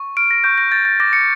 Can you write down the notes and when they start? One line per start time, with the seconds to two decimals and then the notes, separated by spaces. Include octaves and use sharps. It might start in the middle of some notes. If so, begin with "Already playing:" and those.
Already playing: C#6
0.17 F6 D7
0.31 A#6
0.44 C#6 G6
0.58 A#6
0.71 G6 A6
0.85 A6
1.00 D6 A#6
1.13 C#7